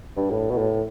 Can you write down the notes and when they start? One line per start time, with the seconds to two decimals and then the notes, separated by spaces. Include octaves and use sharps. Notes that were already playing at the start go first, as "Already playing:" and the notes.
0.17 G2
0.30 A2
0.50 B2
0.57 A2